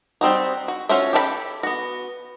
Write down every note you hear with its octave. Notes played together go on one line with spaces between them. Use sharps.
G3 C4 D#4 F#4
F#4
C#4 F4 F#4 C5 E5
G4 A4 E5 B5
B3 F#4